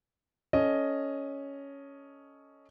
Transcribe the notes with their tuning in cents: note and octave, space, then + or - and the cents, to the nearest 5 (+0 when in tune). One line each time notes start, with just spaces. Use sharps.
C#4 +5 A4 +0 D#5 +0